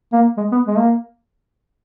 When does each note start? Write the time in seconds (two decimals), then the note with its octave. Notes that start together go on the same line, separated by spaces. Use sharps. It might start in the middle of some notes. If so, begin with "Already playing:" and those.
0.13 A#3
0.37 G#3
0.52 B3
0.67 G#3
0.78 A#3